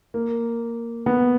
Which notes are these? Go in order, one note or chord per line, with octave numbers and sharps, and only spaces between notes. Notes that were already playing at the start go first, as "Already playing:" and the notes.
A#3
B3